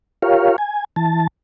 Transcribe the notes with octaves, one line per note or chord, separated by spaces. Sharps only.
F4 G4 A#4 C#5 F5
G#5
E3 A5